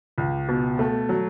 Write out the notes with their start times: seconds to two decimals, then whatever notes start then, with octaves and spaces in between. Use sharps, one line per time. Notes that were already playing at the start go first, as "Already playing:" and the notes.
0.18 C#2
0.48 B2
0.79 A3
1.09 F#3